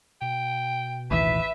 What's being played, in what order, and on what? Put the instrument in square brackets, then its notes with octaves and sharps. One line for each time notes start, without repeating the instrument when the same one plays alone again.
[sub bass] B2 [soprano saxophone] G5
[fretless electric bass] A1 D#2 E3 [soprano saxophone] B4 [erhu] E5